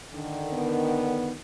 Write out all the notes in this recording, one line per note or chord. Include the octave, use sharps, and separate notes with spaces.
D3 D#3
B3